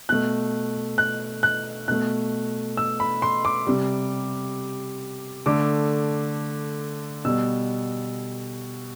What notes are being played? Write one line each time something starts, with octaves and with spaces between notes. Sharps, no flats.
B2 A3 F#6
F#6
F#6
B2 A3 F#6
E6
B5
C6
D6
C3 G3
D3 A3 D6
B2 G3 E6